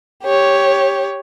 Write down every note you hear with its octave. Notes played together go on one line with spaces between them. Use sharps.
G4 C#5